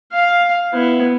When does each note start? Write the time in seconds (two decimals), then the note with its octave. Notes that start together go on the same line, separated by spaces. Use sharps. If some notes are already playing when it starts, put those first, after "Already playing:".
0.12 F5
0.74 B3 E4